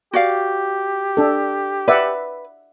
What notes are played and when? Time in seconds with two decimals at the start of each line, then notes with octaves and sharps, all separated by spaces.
0.14 F#4 G4 D5 F5
1.17 D4 A4
1.88 B4 D5 E5 F#5